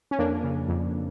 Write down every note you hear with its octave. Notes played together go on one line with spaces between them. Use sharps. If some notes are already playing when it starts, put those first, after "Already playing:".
C#4
F2 A#3 D4
C#3
F2